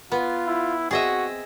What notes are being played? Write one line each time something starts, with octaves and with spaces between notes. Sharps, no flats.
B3 F4
E4
C4 F#4 G#4 D#5 E5